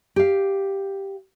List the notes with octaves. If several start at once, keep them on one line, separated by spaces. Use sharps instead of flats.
G4 F5